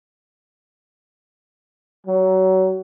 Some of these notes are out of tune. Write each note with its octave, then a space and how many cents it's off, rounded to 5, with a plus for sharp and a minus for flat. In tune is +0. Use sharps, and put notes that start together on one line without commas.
F#3 +25